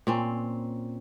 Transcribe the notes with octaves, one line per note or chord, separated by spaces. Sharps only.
A#2 C4 C#4